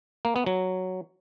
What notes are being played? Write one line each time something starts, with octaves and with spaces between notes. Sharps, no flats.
A#3
B3
F#3